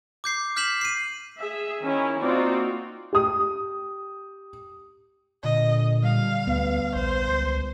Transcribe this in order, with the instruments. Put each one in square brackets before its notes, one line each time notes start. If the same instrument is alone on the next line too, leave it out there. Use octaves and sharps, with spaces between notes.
[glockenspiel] D6 G6 C7
F6 G6 B6 C7 E7 F#7
C7 D#7
[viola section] G#4 E5
D#3 C#4 E4 G#5
A#3 C4 D#4 F4 F#4 D5
[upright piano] G4 D#6
[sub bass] A#2 [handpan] D3 [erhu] D#5
[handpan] G3 [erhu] F5
[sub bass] D2 [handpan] B3
[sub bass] A#1 [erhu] C5
[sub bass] C#2